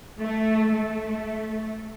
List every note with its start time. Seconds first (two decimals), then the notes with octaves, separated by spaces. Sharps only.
0.20 A3
0.72 A3